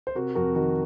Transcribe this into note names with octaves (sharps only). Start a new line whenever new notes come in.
C5
C3 F#4 A#4
F2 F#4 A#4
D#3 F#4 A#4